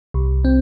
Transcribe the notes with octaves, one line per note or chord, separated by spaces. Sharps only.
C2
C4